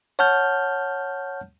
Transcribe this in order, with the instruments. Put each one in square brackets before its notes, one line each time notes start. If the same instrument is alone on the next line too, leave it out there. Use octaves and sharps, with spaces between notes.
[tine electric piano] C#5 F#5 A5 F6 G6